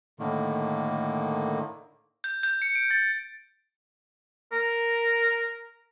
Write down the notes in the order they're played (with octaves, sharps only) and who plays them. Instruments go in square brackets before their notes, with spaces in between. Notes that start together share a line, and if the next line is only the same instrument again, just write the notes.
[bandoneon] A2 D3 D#3 A#3
[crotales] G6
G6
C#7
D7
A6
[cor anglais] A#4